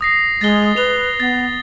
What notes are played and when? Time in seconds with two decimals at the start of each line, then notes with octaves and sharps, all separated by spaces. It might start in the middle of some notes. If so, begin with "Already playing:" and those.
0.01 D#6 A#6 C7
0.41 G#3 A6 G7
0.76 B4 F7 G7
1.20 B3 A6